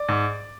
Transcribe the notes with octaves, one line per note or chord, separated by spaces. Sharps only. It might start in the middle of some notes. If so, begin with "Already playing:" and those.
Already playing: D5
G#2